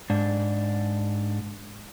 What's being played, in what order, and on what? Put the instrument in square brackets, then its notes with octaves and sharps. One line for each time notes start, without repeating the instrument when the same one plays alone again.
[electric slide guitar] G#2 D4